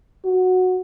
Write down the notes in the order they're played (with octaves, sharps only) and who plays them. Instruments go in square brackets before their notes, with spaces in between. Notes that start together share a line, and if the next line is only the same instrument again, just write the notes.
[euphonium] F#4